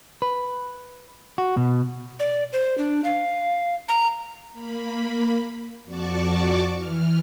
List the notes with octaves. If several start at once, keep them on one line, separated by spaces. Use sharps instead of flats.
B4
F#4
B2
D5
C5
D4
F5
A#5
A#3 B5
F2 F#4 D5 A5 C#6 D6
E3 F6